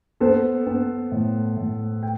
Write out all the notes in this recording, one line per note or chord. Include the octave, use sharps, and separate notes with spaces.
B3 A4 C5
B3
A2
A2
G5